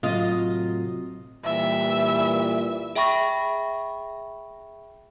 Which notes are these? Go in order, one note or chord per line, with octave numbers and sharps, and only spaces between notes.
A2 C3 F#3 F4 D#5
A#2 E3 G3 E5
G#4 E5 G5 B5 C#6 A#6